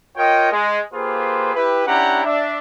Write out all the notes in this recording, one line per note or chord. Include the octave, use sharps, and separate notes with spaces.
F4 A#4 C#5 D#5 G5
G#3
A#3 F4 G4 G#4 B4 C5
E4 G4 B4
C#4 D4 E4 G4 F#5 A#5
D4 E5